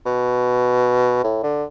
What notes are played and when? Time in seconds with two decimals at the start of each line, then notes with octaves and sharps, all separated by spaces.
0.06 B2
1.24 A2
1.43 D3